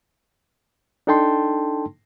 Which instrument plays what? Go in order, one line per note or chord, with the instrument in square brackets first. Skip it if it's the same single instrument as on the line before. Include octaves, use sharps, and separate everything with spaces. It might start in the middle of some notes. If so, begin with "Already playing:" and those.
[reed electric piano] D4 D#4 A4 G5 A5 C6